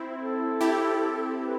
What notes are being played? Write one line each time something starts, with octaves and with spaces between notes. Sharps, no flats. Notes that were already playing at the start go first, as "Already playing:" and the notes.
Already playing: C4 E4
A4
E4 G4
B4